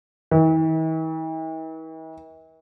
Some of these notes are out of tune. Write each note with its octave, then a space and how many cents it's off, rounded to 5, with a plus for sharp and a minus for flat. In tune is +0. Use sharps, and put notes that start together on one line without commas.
E3 -45